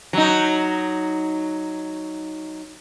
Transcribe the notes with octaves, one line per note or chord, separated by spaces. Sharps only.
F#3 D#4